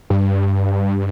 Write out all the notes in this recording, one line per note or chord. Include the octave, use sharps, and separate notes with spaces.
G2